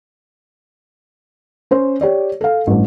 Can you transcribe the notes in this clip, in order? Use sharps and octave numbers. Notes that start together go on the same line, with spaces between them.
C#4 C5
G4 C#5 D5
A4 F5
A1 G2